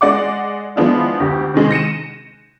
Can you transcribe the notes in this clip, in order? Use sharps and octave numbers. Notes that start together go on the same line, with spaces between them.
G#3 D5 F#5 D6
F3 G#3 B3 D4 E4 F4
D2 G4
C3 D#3 G#3
A#6 C#7 D#7 E7